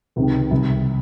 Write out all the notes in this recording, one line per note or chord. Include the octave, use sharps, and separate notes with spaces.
C#2 C3 D#3
C2 C3 D#3